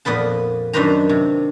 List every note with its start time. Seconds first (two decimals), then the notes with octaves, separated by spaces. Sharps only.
0.05 F2 A#2 B3 B4 A5
0.73 F#2 D#3 D4 B4 C5 A#5
1.09 C3